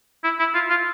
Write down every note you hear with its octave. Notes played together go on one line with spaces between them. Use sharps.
E4
E4
F4
F4